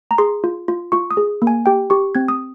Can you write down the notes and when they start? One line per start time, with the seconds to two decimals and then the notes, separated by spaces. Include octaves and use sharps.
0.11 A#5
0.18 G#4 C6
0.44 F4
0.68 F4
0.92 F4 C#6
1.11 D#6
1.17 G#4
1.42 A#3
1.47 G#5
1.66 G4 G5
1.90 G4 C#6
2.15 C4 G#6
2.28 D#6